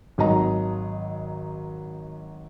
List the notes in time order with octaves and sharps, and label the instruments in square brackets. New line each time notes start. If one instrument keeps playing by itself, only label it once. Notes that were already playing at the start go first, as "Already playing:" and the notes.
[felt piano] G#1 F#3 D#5 A#5